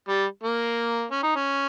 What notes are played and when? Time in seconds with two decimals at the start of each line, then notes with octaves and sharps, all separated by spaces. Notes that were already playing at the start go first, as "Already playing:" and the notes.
0.09 G3
0.43 A#3
1.11 C#4
1.23 D#4
1.36 C#4